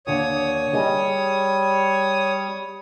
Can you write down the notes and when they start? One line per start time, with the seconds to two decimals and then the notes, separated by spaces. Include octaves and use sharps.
0.07 D#2 D3 C#5 D#6
0.73 G3 G#4 D#5 G#5